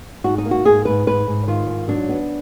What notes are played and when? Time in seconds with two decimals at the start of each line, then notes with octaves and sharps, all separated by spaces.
0.24 G#2 F#4
0.38 D#4
0.45 A#3
0.51 F#4
0.65 G#2 G#4
0.85 G#2 B4
1.07 G#2 B4
1.27 G#2
1.48 D#3 F4
1.67 G#2
1.88 F#3 D4
2.09 B3